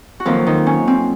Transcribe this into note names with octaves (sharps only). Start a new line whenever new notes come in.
F#4
F2 D#3 F3 F#3 A#3 F4
D#3 D#4
C#4
C4